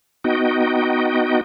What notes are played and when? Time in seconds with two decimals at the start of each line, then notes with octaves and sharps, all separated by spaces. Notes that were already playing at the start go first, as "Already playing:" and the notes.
0.24 B3 D#4 F#4 D#5 G5